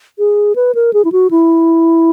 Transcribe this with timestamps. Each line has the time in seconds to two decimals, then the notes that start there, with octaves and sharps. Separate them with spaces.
0.19 G#4
0.56 B4
0.75 A#4
0.93 G#4
1.05 E4
1.12 F#4
1.31 E4